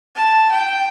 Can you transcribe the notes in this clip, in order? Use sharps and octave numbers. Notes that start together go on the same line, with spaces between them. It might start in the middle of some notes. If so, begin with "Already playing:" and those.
A5
G5